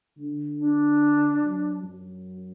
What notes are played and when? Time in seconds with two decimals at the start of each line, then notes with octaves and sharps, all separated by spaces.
0.18 D3
0.59 D4
1.42 F#3
1.84 F#2